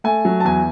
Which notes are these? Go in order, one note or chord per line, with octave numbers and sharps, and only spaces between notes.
A3 G#5
F#3
A5
E2 G#5